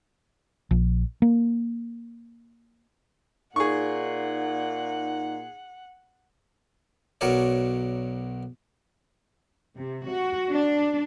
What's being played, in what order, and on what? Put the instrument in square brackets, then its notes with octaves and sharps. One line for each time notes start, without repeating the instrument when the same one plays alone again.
[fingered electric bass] A#1
A#3
[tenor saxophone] A#2 [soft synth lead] D#4 [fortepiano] G#4 C#6 [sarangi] F#5
[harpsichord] B1 F#3 A#4 C#5 D5
[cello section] C3
F#4
D4